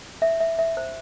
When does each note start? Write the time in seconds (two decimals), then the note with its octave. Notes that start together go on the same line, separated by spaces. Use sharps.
0.22 E5
0.40 E5
0.59 E5
0.77 C5